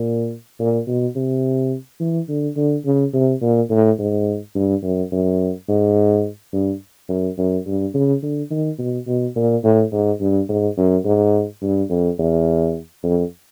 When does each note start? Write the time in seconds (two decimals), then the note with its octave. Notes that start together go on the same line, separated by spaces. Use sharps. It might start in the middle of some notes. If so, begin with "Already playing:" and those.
Already playing: A#2
0.60 A#2
0.87 B2
1.16 C3
2.00 E3
2.29 D3
2.57 D3
2.85 C#3
3.14 C3
3.42 A#2
3.71 A2
3.99 G#2
4.56 G2
4.83 F#2
5.12 F#2
5.69 G#2
6.53 G2
7.09 F#2
7.38 F#2
7.67 G2
7.94 C#3
8.23 D3
8.51 D#3
8.79 B2
9.08 B2
9.36 A#2
9.64 A2
9.92 G#2
10.20 G2
10.49 G#2
10.78 F#2
11.05 G#2
11.62 G2
11.90 F2
12.19 E2
13.03 F2